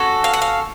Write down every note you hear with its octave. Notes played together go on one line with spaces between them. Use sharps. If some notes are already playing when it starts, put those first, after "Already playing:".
Already playing: C#4 F#4 A4
F5
F#5
F5